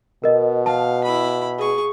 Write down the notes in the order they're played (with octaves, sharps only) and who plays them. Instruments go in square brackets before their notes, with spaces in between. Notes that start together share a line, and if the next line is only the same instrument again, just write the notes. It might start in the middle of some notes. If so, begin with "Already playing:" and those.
[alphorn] B2 [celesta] A#4 D#5
[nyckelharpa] F5 [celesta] A5
[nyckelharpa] E4 B5
G#4 C#6